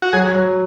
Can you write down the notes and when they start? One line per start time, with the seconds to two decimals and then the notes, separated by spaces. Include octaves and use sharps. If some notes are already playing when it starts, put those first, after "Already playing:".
0.02 F#4
0.13 F#3 G#4
0.35 F#3